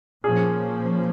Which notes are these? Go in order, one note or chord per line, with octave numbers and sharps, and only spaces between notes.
A#2 F3 A#3 C#4 G#4